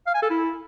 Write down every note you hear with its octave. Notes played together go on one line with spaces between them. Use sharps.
F5
G#5
A4
E4